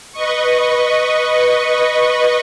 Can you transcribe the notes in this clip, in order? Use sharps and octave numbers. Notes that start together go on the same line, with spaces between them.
B4 D#5 C#6